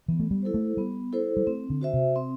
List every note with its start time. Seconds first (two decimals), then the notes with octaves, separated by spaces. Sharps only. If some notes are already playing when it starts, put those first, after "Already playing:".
0.08 E3 B3
0.19 A3
0.31 G3
0.43 E4 A4 C5
0.54 A3
0.77 G3 B3
1.13 E4 A4 C5
1.37 G3
1.47 A3 C4
1.70 D3
1.81 F#4 C5 E5
1.93 C3
2.16 C4